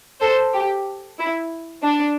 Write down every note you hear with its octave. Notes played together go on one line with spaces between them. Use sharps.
A4 C5
G4
E4
D4